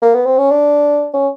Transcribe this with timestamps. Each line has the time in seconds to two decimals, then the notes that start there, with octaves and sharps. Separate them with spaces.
0.02 A#3
0.14 B3
0.26 C4
0.38 C#4
0.50 D4
1.13 C#4